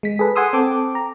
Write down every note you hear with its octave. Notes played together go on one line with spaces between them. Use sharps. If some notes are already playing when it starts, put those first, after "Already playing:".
G#3 B6
G#4 A4 B4
F#5 G#5 C6 D#6 E6
C4 A4 G5 D6
A#5